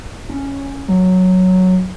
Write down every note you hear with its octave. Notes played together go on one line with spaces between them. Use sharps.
C#4
F#3